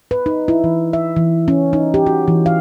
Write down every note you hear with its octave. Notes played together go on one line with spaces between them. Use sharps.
B4
D#4
E4
E3
E5
E3
C#4
D#4
G4
F#4
E3
F5